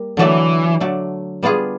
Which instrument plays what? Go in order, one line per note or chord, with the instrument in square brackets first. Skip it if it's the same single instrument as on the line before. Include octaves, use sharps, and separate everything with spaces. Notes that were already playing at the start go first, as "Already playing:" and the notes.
Already playing: [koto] G3 A#3
[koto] D3 F#3 A3 D4 [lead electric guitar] E3
[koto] D3 F#3 A3 D4
G3 B3 D4 F4 G#4